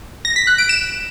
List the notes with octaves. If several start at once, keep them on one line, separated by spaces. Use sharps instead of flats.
A#6
B6
F#6
D7
E7